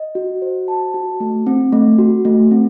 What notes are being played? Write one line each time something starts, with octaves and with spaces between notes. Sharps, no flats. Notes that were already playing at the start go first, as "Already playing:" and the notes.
Already playing: D#5
F#4
C5
A5
F#4
A3
C4
A3
F#4
A3
C4